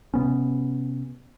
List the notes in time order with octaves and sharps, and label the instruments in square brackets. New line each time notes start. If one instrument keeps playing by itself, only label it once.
[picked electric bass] C3 B3 C#4